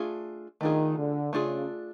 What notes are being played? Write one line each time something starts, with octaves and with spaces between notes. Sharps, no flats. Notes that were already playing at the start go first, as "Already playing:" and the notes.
Already playing: A3 D4 F4 G#4
D#3 A3 D4 F4 G#4
D3
C#3 A3 D4 F4 G#4